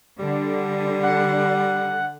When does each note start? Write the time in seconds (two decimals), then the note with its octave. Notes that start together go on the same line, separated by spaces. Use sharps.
0.19 D3 G3
1.03 F#5